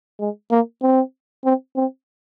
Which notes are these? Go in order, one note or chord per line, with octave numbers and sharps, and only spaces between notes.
G#3
A#3
C4
C4
C4